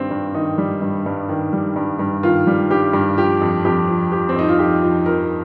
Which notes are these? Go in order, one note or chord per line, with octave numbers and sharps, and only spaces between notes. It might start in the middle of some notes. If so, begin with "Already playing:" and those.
Already playing: G2 D#3 G3 C4
G2
D#3 D#4
G3
G2
G2
D#3
G3
G2
G2
D#3 F4
G3
G2 G4
G2
F3 G4
F2
F2 G4
F3
F3 G4
C4
F2 D#4
F4
F2 G4
F3
F3 A#4